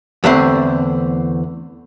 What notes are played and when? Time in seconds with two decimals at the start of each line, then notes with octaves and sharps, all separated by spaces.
0.24 E2 D3 A3 C4